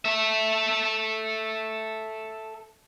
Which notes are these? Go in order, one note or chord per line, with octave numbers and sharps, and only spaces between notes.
A4 E5